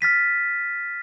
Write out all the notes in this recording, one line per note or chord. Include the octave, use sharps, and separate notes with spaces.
F6 A6 B6 D#7